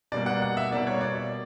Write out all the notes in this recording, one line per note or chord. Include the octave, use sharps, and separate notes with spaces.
B2 G3 A#3 D5
F#5
F#5
E5
B2 G3 A#3 D5
C#5
D5